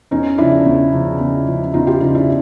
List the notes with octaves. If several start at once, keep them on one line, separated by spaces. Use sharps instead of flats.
E2 C#4 D#4
C#3 F3 D4 E4
E2
C#3 F3
E2
C#3 F3
E2 D#4 F4
F4 G4
C#3 F3 D#4 F4
D4 E4